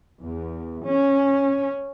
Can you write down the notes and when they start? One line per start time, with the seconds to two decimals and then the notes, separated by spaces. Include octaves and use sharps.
0.20 E2
0.84 C#4